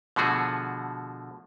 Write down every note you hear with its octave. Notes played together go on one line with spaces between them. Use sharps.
B2 D3 F3 A3 F#4 G#4